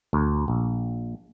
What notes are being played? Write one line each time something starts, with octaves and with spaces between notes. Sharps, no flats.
D2
A#1